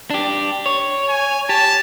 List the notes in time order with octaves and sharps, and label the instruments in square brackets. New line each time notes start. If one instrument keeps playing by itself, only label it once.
[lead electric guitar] D4 G4
C#5
[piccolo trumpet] G#5
[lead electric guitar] G4 [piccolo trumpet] A5